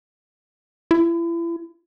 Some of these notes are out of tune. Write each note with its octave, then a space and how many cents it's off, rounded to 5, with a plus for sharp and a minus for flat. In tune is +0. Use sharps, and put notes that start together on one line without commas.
E4 +35